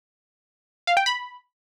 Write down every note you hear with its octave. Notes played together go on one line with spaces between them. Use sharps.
F5
G5
B5